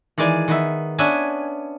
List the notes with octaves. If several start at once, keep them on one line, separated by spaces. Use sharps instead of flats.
D#3 E3 G#3 D5 G#5
D#3 B3 E5
B3 C#4 D4 E5 G#5